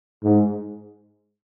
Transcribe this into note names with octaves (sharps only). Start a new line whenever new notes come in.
G#2